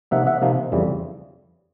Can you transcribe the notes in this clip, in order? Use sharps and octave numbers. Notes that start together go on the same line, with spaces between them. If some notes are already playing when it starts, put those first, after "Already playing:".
C3 F3 A#3 D#4 E5 F#5
E5 F#5
C3 F3 A#3 D#4
F2 C#3 E3 G3